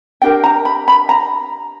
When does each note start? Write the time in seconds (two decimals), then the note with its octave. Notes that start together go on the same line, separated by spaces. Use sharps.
0.22 D4 G4 A#4 G5
0.44 A#5
0.65 B5
0.88 B5
1.09 A#5